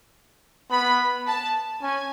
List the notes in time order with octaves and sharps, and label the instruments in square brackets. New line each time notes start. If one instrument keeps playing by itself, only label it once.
[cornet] B3 [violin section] B5
[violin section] A5
[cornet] C#4 [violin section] G#5